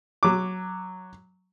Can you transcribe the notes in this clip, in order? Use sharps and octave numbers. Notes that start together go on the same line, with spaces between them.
F#3 D6